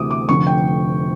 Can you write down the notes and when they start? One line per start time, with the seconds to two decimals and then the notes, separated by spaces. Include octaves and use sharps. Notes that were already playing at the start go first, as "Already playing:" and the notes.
Already playing: D2 C3 E3 D6 D#6
0.11 D6
0.29 F1 F2 D3 C#6
0.47 G5